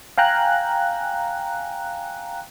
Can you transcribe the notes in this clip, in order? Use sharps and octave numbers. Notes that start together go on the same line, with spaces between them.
F5 G5 G#5 A#5 F#6